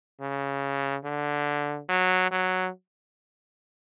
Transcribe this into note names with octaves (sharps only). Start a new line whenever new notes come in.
C#3
D3
F#3
F#3